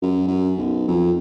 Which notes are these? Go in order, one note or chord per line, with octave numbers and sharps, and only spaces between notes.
F#2
F#2
B1
F2